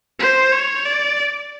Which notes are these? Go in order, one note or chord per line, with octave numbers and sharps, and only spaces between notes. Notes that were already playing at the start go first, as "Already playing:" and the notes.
C5
C#5
D5